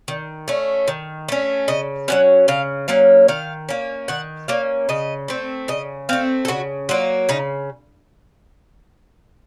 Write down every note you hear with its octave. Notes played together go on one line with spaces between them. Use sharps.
D#3
A3 C#4
D#3
A3 C#4
C#3 D#5
F#3 A#3 C#4 F#5
C#3 F5
F#3 A#3 C#4 F5
D#3 F5
A#3 C#4
D#3 F#5
A#3 C#4 F5
C#3 D#5
A3 C4
C#3 D#5
A3 C4 F5
A4
C#3 F#4
F#3 A#3 F4
C#3 D#4